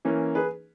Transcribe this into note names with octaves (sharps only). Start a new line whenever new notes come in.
E3 A#3 C#4
G#4 B4